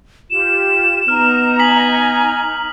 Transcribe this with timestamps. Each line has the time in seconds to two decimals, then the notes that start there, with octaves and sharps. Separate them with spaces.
0.30 F4 G4 E7
1.08 B3 D#4 A#5 F6
1.59 G#5 D#6 B6 F#7